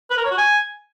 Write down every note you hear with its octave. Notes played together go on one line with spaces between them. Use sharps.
B4
A#4
C#5
F#4
G#5